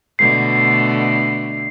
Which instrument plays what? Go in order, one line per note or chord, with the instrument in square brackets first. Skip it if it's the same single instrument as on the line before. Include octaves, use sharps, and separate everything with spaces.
[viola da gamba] B2 D3 A3 [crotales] C7